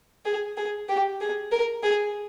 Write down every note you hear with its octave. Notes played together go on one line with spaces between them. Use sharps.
G#4
G#4
G4
G#4
A#4
G#4